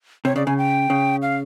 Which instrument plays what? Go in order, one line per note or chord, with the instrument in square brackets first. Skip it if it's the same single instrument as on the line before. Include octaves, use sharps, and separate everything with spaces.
[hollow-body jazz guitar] C3 [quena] C#5
[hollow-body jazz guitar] C#3 [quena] D5
[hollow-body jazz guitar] C#3 [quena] G#5
[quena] G5
[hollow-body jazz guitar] C#3
[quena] F5